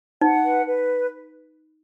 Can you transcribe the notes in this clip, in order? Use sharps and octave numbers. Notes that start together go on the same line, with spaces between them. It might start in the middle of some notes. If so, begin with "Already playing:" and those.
D#4 F#5
B4
B4